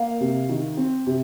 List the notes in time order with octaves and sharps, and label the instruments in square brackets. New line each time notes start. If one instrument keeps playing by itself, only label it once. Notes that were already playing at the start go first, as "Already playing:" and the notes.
Already playing: [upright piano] A#3 F5
C3
D#3
C4
C3